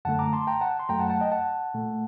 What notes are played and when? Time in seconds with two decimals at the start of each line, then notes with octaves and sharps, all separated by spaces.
0.05 F#2 D3 A3 F#5 A5
0.19 A#5 D6
0.33 A5 C6
0.47 G5 A#5
0.61 F#5 A5
0.80 C6
0.89 F#2 F#3 A3 G5 A#5
0.99 F#5 A5
1.10 F#5 A5
1.20 D#5 G5
1.32 F#5 A5
1.74 A#2 A3